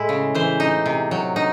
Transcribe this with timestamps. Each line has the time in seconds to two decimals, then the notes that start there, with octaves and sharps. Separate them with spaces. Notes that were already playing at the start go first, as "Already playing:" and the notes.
Already playing: A2 G#3 E4
0.09 C#3
0.35 E3 C5
0.60 D#4
0.86 C3
1.11 F#3
1.36 D#4